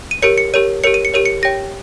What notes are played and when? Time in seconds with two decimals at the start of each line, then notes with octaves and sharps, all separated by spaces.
0.11 D#7
0.22 G4 A#4 C#5 C#7
0.38 C#7
0.54 G4 A#4 C#5 D#7
0.84 G4 A#4 C#5 C#7
0.94 D#7
1.05 C#7
1.14 G4 A#4 C#5 D#7
1.26 C#7
1.43 G4 C#5 G5 A#6